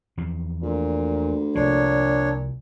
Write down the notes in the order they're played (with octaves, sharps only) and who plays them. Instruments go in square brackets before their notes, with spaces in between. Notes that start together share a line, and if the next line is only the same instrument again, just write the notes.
[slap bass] E2 F3
[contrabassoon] D2 [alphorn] A#2
[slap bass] C2 F3 [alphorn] A#2 [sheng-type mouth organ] D4 C#5